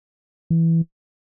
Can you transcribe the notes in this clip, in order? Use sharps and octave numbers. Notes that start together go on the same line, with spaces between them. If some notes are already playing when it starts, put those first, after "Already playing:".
E3